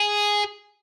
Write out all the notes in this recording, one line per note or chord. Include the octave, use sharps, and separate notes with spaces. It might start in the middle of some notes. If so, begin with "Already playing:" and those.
Already playing: G#4